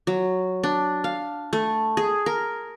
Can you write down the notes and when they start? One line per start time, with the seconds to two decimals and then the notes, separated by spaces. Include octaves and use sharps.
0.07 F#3
0.63 D4
1.04 F5
1.53 A3
1.97 G#4
2.26 A#4